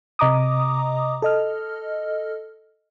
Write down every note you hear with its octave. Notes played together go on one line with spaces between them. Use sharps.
C3 D#5 A#5 D6 D#6
A4 D#5 F6